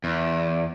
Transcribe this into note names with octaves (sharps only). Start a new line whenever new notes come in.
E2